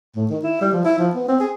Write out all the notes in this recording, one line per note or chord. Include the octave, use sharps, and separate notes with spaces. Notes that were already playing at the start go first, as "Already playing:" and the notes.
A2
D#3
E4
G3
F3
E4
F3
B3
C4
G#4